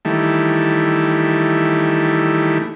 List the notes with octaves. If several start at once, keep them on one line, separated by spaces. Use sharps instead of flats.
D#3 E3 G3 A3